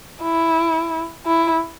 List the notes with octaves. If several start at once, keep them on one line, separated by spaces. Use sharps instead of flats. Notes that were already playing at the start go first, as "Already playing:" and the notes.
E4
E4